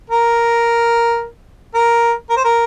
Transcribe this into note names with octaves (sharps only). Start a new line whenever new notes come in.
A#4
A#4
A#4
C5
A#4